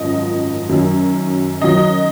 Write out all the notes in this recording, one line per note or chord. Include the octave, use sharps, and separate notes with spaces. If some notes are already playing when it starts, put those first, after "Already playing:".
Already playing: G#1 F#2 F3 D#5
F#2 D#3 F#3
F#2 D#3 F#3 D#5